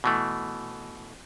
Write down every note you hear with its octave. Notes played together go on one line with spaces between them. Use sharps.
B2 E3 A3